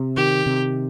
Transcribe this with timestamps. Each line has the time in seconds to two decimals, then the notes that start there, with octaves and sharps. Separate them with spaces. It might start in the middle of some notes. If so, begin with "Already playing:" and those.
Already playing: C3
0.17 D#3 G4
0.46 C3